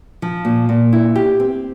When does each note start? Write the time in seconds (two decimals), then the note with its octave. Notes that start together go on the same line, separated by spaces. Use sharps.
0.22 F3
0.45 A#2
0.69 A#2
0.93 E4
1.16 G4
1.40 C4